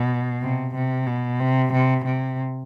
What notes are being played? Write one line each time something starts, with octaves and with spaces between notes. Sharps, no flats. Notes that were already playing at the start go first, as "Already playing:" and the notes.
Already playing: B2
C3
C3
B2
C3
C3
C3